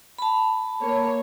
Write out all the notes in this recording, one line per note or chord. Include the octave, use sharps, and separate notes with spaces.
A5 B5
A#3 C#5